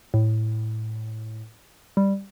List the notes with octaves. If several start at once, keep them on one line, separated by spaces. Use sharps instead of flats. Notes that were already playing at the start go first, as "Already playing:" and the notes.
A2
G3